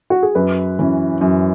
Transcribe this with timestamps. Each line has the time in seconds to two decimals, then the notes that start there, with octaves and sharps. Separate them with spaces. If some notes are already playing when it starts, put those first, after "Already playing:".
0.10 F#4
0.23 G#4
0.35 F#2 B4
0.79 E3 C#4
1.21 F#2